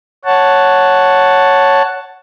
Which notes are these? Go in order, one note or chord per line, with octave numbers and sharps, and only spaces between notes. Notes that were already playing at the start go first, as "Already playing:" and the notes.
C#5 F#5 A5